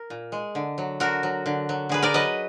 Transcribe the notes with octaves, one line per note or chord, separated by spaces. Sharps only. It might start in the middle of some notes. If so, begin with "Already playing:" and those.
Already playing: A#4
A#2
G#3
D3
F#3
D3 F#4 A#4
F#3
D3
F#3
D3 G#4 B4
A#4 D5
F#3 B4 D#5